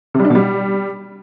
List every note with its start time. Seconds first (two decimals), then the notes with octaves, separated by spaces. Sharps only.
0.14 C3
0.20 G3
0.25 D4
0.30 B2
0.35 G3